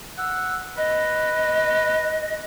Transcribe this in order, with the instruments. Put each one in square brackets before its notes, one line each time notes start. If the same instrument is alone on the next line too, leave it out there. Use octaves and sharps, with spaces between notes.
[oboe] F#5 [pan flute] E6
[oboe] B4 [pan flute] D#5